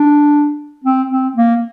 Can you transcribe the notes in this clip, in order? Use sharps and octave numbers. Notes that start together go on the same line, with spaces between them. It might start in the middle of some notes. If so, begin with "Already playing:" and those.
Already playing: D4
C4
C4
A#3